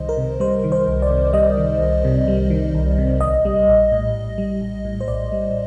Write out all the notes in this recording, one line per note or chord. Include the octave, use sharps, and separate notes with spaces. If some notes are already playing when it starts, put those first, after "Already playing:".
Already playing: C2 D#3 G3 C5 D#5
A#4
C3
G3 C5
D#3
C5
C2
D5
C3
G3 D#5
D#3
C2
C3
G3
D#3
C2
C3
A#1 D#5
G3
A#1
A2
A#1
G3
A#1
A2
C5
A#1 D5
G3